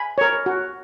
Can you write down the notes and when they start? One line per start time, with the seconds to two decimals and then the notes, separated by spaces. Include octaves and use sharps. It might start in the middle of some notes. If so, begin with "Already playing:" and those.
Already playing: G#5 B5
0.18 A#4 C#5
0.46 F#4